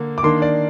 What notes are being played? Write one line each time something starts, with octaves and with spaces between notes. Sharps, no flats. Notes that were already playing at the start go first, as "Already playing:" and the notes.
Already playing: D3 A#3
D6
D#3 A#3 D4 C6
D5